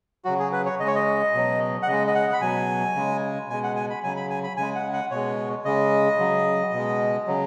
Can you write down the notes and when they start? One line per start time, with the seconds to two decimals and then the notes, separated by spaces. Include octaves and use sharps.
0.25 C#3 F#3 F#4
0.39 G#4
0.52 B4
0.66 C#5
0.79 C#3 D#5
0.83 G#3 C#5
0.95 D#5
1.34 B2 F#3
1.83 F#5
1.87 C#3 G#3 D#5
2.07 D#5
2.15 F#5
2.33 B5
2.41 B2 F#3 G#5
2.96 C#3 G#3
3.49 B2 G#3 G#5
3.63 F#5
3.76 G#5
3.90 B5
4.03 C#3 F#3 G#5
4.17 B5
4.30 G#5
4.44 B5
4.57 C#3 G#3 G#5
4.75 F#5
4.93 F#5
5.11 B2 G#3 C#5
5.65 C#3 G#3 D#5
6.19 C#3 F#3
6.73 B2 G#3
7.27 C#3 F#3